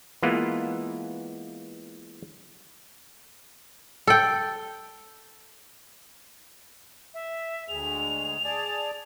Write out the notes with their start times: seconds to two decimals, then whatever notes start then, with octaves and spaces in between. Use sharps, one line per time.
0.23 E3 G#3 A#3 B3 F4
4.07 A4 G5
7.14 E5
7.68 D2 G#3 F7
8.44 G#4 D5 A5